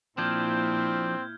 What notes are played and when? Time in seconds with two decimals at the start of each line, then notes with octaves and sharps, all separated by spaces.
0.18 A#2 F3 C4 D4 E4 F6 G6 G#6